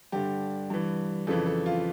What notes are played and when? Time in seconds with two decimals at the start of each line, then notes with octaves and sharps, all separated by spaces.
0.12 G2 D3 G4
0.70 G2 E3
1.27 F2 C#3 E3 A4
1.46 A4
1.66 F4